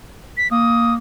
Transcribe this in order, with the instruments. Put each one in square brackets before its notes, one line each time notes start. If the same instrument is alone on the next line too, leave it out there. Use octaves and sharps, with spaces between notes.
[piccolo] B6
[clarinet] A#3 [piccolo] D#6